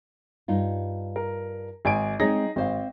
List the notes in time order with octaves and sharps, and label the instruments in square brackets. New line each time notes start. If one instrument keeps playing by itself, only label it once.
[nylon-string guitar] G2 D#4 F4
[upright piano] A#4
G#1 G#5 D7
[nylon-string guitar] G#3 C4 C#5 [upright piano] D#4 G#4 A#6
[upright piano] G#1 [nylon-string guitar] C4 C5 F5